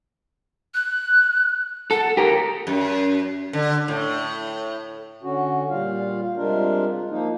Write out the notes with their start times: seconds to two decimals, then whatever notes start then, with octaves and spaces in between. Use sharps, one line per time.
0.74 F#6
1.91 A4 F#5
2.17 G4 A#4
2.67 F#2
3.53 D3
3.88 A2
5.23 D3 C#4 F#4
5.70 A#2 G3 F4 F5
6.36 C3 G3 G#3 D4 F4 A#4
7.10 F3 A#3 D#4